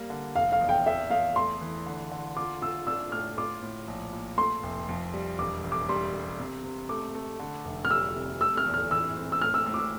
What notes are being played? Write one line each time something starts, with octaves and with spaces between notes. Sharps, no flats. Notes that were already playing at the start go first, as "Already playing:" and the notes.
Already playing: G3 A#3
D3
F1 F5
F5
E2
G5
E2 E5
E2 F5
A3 C6
E3
D3
D3
F4 D6
F4 E6
D4 E6
A2 F6
F4 D6
A2
A#1
A#2
A3 C6
F1
F2
G3
E1 D6
E1
D6
G3 C6
G3
C3
C3
A3 D6
A3
D3
F1
F6
G3 E6
C3
A3 E6
F6
E2
F6
E3 E6
C4
E6
A2 F6
E6
A2 E6
D6
E6